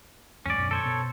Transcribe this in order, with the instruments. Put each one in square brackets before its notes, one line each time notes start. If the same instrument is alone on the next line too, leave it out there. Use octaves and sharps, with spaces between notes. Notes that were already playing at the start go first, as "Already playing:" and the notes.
[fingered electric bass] E2 G#2 [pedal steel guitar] C#4 D5
[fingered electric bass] F#2 B2 D3
[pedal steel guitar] A4 C5 C#5
[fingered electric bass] B2